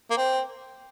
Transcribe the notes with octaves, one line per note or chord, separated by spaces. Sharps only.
A#3
C4